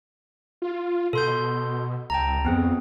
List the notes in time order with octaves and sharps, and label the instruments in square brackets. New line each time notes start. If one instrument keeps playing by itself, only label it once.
[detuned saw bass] F4
[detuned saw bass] B2 [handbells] A4 C6 G6
[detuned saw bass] C#2 [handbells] G5 A5 A#5
[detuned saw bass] F2 [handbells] B3 C4 G#4